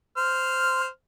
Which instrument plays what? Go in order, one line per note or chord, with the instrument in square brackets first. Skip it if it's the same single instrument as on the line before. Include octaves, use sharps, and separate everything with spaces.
[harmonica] C5 F6